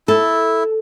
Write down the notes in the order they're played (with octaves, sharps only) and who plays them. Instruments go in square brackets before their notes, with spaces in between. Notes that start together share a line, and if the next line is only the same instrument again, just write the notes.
[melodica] E4 [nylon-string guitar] A4